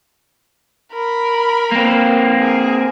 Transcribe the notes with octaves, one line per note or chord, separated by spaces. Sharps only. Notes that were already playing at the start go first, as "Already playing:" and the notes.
A#4 B5
A#3 C4
G#4 A#4